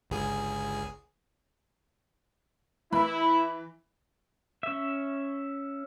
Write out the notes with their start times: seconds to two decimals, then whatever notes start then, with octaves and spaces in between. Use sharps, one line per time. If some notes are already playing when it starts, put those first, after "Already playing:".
0.10 G1 C#2 G#4
2.92 E3 E4 B5
4.63 C#4 E5